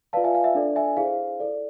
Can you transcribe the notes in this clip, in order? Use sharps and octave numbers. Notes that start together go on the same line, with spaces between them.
F4 B4 D5 F5 A5
E5 G#5
F5
E5
D4 A4 D5
E5 G#5
E4 G#4 C5 F5
E4 A4 D5